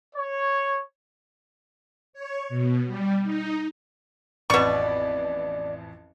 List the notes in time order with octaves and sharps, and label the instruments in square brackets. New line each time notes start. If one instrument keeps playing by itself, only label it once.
[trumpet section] C#5
[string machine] C#5
B2
G3
D#4
[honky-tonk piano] A1 F2 B4 [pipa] B2 C#6 [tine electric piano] D5